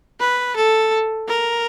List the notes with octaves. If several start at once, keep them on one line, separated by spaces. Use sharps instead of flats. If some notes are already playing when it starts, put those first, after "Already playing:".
B4
A4
A#4